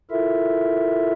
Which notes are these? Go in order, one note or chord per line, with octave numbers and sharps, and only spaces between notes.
E4 F4 A4 A#4 E5